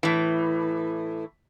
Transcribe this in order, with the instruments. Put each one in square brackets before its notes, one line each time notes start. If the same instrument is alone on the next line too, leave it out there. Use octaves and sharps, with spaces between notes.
[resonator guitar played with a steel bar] A2 E3